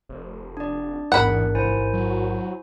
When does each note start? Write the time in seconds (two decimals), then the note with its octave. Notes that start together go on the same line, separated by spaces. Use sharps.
0.09 F1
0.57 D4 D5
1.12 A1 E2 G#2 A#4 F#5 B5
1.55 F1 E4 C5 G#5
1.93 F#3